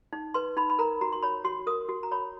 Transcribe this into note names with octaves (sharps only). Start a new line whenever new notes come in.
D#4
B4 C6
D#4 B5
B5
A#4 A#5
F#4 A#5
C6
C#5 B5
F#4 C6
A#4 D#6
F#4
A#5
C#5 B5